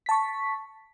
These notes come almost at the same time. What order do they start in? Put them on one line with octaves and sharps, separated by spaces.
B6 A5 C#6